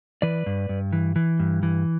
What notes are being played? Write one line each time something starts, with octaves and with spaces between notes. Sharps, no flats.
E3 B4 D5
G2
G2
E3
E3
G2
E3